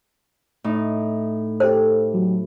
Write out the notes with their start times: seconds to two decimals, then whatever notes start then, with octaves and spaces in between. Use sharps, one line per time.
0.64 A2 D#4
1.60 G4 A4 C5
2.14 F#3